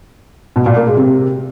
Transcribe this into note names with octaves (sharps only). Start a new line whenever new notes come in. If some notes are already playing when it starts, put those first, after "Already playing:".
B2
A#2
A#3
G#3
C3